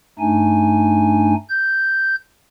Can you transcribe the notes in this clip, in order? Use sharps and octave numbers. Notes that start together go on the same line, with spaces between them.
G2 A3 D4 D#4 G#5
G6